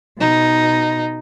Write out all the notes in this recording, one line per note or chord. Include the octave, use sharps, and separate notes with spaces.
B2 D#4